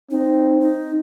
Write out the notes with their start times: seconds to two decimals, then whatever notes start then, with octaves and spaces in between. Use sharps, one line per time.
0.10 C4 D#4
0.61 D#4